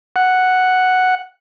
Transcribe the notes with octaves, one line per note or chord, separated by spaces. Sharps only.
F#5